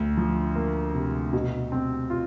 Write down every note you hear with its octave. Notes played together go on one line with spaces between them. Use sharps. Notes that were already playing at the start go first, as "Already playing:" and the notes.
Already playing: D2
F3
A#3
C3
B2
C4
F4